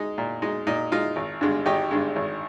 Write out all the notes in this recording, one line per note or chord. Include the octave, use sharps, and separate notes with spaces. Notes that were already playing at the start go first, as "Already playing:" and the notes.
Already playing: G#3 D#4
A#2
G#3 D#4
A#2 D#4
G#3 D#4 F4
G#1
G2 D3 G#3
G#1 D#4 G4
G2 D3 G#3
G#1